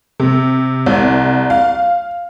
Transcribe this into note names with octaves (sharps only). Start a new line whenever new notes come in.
C3
C2
F5